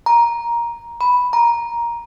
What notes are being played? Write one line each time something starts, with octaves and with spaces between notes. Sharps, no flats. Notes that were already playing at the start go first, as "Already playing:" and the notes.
A#5
B5
A#5